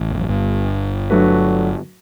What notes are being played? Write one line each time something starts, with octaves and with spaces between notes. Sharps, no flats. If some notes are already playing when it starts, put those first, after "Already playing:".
Already playing: A1
E2
F#2
G1 G2
F#3 A3 D4 F#4 B4